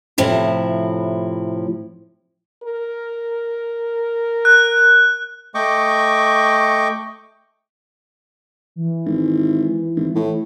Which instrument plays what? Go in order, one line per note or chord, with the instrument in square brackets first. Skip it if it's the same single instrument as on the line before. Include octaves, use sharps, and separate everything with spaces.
[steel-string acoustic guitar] A2 C3 F3 E4
[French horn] A#4
[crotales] F#6
[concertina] A3 D#5 G5 C#6 D6
[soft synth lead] E3
[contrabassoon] G#1
G#1
A2